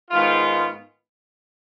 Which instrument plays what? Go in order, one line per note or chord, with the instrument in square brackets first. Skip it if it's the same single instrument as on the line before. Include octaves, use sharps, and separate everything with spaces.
[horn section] G#2 D#3 G#3 B3 F4